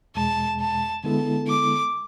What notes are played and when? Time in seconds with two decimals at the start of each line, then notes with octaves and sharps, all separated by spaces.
0.15 E2 B2 G#3 A5
0.60 A5
1.04 D3 G#3 B3 E4 A4 A5
1.48 D6